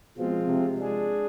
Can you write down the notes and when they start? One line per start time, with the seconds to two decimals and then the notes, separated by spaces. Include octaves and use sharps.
0.17 B2 F3 G#3 C4 F4
0.47 C3
0.78 G#3 D4 G#4